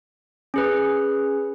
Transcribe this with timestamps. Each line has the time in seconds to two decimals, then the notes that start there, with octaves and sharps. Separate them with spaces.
0.54 C#4 G#4 B4